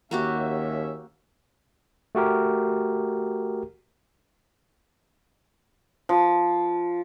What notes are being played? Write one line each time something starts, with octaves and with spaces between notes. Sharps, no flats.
D#2 A#3 C#4 F#4 G4 E5
A3 F#4 G4 A#4
F3